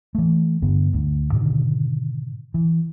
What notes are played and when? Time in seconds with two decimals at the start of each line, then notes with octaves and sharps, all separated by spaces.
0.15 E3 A3
0.62 G2 D3 B3
0.93 D2
1.32 G#2 B2 D3 D#3
2.54 E3